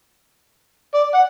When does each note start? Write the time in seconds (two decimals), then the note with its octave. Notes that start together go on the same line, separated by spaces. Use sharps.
0.94 D5
1.14 F#5